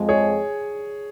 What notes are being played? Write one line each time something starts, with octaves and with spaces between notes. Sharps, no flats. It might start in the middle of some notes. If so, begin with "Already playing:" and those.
Already playing: F2 F3 G#3
G#4 C#5